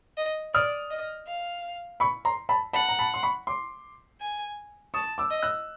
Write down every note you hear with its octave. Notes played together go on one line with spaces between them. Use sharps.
D#5
D5 D#6 F6
D#5
F5
B5 C#6
A#5 C6
A5 B5
F#5 A5 B5
A#5
A5 B5
C6
B5 C#6
C6 D6
G#5
A5 C#6 D#6
D6 E6
D#5
E6 F#6